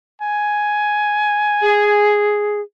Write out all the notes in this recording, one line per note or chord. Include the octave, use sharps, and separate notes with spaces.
G#5
G#4